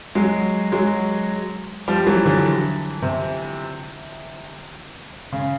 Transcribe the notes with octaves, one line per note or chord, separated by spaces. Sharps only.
F#3 G#3
F#3 G#3
F3 G3
E3 F#3
D3 E3
C3
C#3